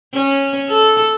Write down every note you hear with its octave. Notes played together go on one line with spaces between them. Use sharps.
C#4
A4